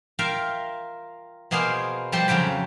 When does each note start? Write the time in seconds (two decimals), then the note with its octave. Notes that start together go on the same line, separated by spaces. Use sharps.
0.19 F4 A#4 E5 F5 G5
1.51 B2 A#3 B3 G#4 C5 F5
2.12 F3 G3 G4 A4 C5 C6
2.28 F2 C#3 F#3 G5 B5